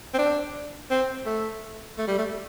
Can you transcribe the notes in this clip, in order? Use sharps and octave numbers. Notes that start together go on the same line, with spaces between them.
C4
D4
C4
A3
A3
G3
A3